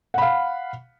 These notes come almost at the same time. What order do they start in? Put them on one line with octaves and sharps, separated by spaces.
F#5 B5 F5